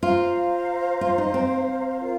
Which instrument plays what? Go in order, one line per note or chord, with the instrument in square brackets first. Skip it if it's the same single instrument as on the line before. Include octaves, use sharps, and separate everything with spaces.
[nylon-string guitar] F4 [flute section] C5 F5 A#5
[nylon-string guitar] F4
D#4
C4
[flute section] F4 A#4 F5